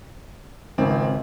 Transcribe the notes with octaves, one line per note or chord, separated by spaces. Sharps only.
G#1 C#2 C4